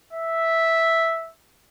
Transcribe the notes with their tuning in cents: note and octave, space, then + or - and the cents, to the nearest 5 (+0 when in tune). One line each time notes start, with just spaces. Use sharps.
E5 -5